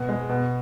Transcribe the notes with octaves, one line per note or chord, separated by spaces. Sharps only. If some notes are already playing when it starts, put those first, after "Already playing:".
Already playing: B2
G#3
B2